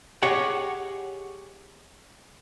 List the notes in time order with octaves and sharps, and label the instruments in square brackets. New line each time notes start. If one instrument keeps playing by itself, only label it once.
[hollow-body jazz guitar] G4 G#4 C#5 D#5 F#5